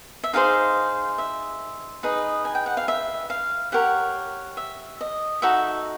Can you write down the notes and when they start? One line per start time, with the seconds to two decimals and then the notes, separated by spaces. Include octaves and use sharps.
0.24 E5
0.33 D#4 G#4 C5 F5
1.18 E5
2.03 D#4 G#4 B4 D#5
2.45 G#5
2.55 G5
2.66 F#5
2.77 F5
2.88 E5
3.30 F5
3.72 G4 A#4 C#5 F#5
4.57 E5
5.01 D#5
5.42 D#4 F#4 A4 E5